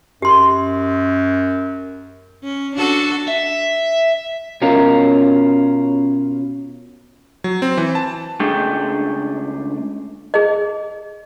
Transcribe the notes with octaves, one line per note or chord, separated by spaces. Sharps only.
F#2 G4 C6
C#4
D4 F#4 A4
E5
B2 C#4 F4 A#4
F#3
C4
E3
A5
C#2 A3 D4 G#4 G5
G#4 D#5